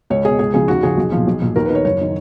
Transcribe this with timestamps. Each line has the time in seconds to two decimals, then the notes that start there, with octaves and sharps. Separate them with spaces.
0.10 C#2 C#5
0.25 B2 G#4
0.39 C#2 G#4
0.54 C#3 F3 G#4
0.68 D#2 F#4
0.83 C#3 F3 G#4
0.98 B1
1.12 A#2 F3
1.27 B1
1.42 A#2 F3
1.56 D#2 A#4
1.66 B4
1.70 D#3 C#5
1.85 F#1 C#5
2.01 D#3